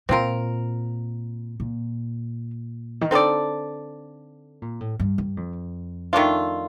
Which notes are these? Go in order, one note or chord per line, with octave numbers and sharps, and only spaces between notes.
A#2 C4 F4 A#4
A#2
D#3
D3 C4 D#4 A4 D5
A#2
A2
G2
G2
F2
D#3 A3 D4 F4